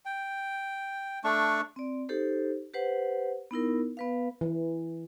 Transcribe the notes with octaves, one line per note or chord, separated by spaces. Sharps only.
G5
A3 D4 C#6
C4 D5
D#4 G4 A4 C5
G4 B4 C5 F#5
B3 D#4 E4 A#4
B3 B4 F5
E3